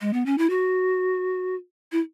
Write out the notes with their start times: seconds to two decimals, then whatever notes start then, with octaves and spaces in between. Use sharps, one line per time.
0.01 G#3
0.13 B3
0.26 C#4
0.38 E4
0.50 F#4
1.92 E4